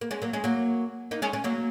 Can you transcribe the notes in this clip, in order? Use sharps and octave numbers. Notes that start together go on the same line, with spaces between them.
A#3
G#3 C#4
F#3 A#3
G#3 C#4
F#3 A#3
A#3 D#4
G#3 C#4
G#3 C#4
F#3 A#3